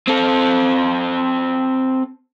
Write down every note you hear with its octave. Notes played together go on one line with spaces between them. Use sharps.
C4 A4